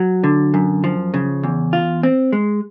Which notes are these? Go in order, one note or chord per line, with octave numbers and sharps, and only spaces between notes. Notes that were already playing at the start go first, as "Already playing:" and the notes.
Already playing: F#3
D3
F#2
F3
C#3
E2
F4
C4
G#3